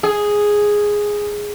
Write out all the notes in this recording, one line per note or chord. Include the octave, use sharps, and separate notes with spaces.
G#4